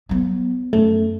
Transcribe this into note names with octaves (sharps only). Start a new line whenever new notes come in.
F#3 B3
F#2 A3